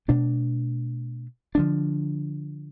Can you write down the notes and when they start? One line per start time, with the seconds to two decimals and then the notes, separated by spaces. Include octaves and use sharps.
0.08 B2 A3 D4
1.55 D3 F3 G#3 D4